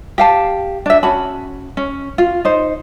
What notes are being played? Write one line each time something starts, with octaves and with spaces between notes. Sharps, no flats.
G4 F5 A5
D4 E5
C#4 F#4 A5 B5
C#4
F4
D#4 C5